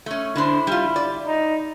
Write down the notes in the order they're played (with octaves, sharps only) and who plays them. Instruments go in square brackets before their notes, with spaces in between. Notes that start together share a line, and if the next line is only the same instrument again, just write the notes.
[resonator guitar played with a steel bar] A3 C#4
[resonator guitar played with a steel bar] D3 D4 C5 [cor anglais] E4
[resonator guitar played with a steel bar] G3 F4
D5
[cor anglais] D#4